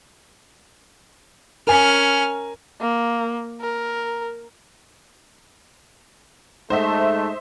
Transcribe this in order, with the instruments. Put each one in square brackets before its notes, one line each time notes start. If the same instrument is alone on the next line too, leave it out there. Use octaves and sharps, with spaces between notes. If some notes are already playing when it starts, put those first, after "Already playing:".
[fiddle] C#4 F6 [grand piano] A#4 G#5
[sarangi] A#3
A#4
[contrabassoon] G#2 [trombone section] A3 [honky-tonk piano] C5 D#5 E5